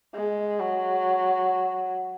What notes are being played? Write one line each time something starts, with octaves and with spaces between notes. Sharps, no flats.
G#3
F#3